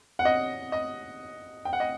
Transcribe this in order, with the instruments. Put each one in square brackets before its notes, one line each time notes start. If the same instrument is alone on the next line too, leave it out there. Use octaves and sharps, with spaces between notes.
[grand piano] F#5
D#5
D#5
G5
F#5
D#5